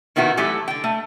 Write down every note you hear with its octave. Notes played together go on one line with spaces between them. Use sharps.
A#2 D#3 B3 E4 F#4
E3 F#3 A3 E4 G4
D3 G5
A3